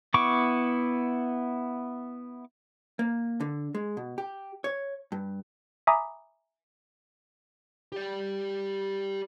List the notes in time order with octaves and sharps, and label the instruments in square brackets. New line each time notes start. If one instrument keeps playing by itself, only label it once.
[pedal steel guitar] B3 E4 C#6 D6
[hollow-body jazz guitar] A#3
D3
G#3
B2
G4
C#5
G2
[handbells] E5 G#5 A#5 B5 D6 D#6
[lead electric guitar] G4 D5